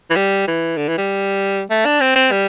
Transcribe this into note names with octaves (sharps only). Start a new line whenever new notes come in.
E3
G3
E3
D3
E3
G3
A3
D4
C4
C4
G3